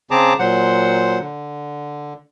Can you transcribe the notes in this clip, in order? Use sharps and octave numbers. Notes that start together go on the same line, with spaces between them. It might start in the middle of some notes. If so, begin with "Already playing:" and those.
C#3 C4 G#4 A5 A#5 D6
A#2 F#3 C5 F#5
D3